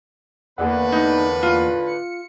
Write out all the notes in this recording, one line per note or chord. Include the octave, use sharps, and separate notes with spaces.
E2 A2 D3 A#3 G#4 B4 D5 F#5
D#4
F4
C#7